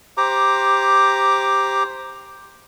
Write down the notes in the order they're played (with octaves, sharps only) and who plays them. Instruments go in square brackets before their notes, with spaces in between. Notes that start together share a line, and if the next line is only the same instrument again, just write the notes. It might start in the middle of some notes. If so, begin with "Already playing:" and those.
[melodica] G4 C5 A#5 D6